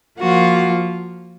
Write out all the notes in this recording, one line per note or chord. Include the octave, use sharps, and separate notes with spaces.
F3 A#3 F4 F#4